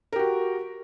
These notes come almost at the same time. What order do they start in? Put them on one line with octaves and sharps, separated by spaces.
A#4 G4 F#4